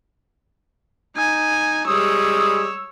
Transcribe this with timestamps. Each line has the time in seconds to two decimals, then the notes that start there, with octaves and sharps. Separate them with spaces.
1.17 D#4 G#5
1.88 G3 G#3 C#5 D#6 E6